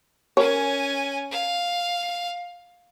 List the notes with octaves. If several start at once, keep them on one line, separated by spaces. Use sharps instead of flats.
C#4 A#4 C#5 G#5
F5